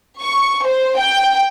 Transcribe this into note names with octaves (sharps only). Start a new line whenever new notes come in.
C#6
C5
G5